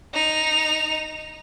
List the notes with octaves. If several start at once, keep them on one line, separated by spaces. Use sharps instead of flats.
D#4 F7